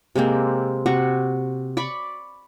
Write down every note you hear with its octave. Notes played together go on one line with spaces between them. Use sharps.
C3 G#3 A#3 C4
C3 F#4 F#5 C#6
D5 B5 C#6